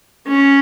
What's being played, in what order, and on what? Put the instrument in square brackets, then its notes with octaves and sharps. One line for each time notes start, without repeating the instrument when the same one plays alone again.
[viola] C#4